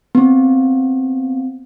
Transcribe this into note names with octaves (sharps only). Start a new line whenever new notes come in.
B3 C4